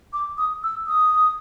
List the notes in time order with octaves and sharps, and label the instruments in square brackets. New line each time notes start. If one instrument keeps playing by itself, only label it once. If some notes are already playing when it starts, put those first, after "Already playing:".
[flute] D6
D#6
E6
D#6